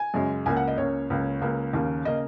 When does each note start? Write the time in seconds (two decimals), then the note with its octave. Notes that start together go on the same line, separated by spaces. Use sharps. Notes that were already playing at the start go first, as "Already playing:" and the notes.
Already playing: G#5
0.14 F#2 C#3 G#3
0.46 C#2 C#3 A#3 G#5
0.57 F#5
0.68 D#5
0.78 C#2 C#3 A#3 C#5
1.10 C#2 C#3 A#3
1.41 C#2 C#3 A#3
1.73 D#2 C#3 A#3
2.05 C#3 A#3 D#5